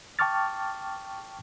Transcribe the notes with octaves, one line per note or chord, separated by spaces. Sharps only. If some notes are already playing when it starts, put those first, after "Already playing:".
G5 A5 C#6 D6 F6 A6